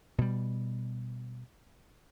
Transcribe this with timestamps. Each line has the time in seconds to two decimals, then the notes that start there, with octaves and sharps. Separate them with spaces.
0.18 B2 G3